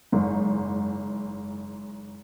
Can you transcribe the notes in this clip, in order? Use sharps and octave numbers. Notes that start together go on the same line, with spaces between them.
F#1 G#2